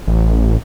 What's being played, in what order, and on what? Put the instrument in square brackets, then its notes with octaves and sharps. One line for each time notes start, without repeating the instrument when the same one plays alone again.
[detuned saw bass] A1